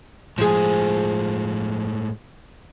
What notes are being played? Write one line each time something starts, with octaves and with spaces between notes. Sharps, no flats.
A2 F3 G#3 G#4